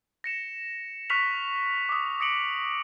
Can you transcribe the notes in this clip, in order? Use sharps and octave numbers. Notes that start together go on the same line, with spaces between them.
A#6 C#7 E7
C#6 F6 F#6 B6 F7
D6 D#6
D#6 A#6 C#7 D7 F#7